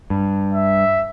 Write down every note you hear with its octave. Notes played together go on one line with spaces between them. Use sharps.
G2
E5